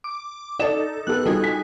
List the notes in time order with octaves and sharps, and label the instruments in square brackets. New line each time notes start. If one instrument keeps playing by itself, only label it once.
[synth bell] D6
[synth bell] D#4 A4 [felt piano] D5 E7
[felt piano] B3 G4 A4 [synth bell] F#6
[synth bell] G3 D#4 G#4 [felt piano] F4 F#4 A4
[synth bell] G#5 [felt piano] B6